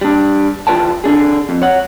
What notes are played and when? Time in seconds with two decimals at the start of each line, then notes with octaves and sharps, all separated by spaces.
0.01 G3 D4
0.67 E3 F4 B4 D5 G5 A5
1.04 D3 D4 G#4
1.49 F2
1.62 C#5 F#5